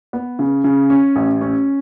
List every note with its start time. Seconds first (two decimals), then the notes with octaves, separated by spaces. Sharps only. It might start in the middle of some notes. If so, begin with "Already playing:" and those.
0.13 B3
0.39 C#3
0.64 C#3
0.90 C#4
1.16 A1
1.41 C#4